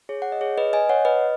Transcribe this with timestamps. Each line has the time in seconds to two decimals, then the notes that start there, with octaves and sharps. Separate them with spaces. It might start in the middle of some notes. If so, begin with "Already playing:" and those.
0.09 G#4 C#5
0.22 F#5
0.32 D#5
0.41 G#4 C#5
0.58 B4 D#5
0.73 D#5 G#5
0.89 C#5 F#5
1.05 B4 D#5